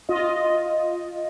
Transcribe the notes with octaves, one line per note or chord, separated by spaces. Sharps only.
F4 D#5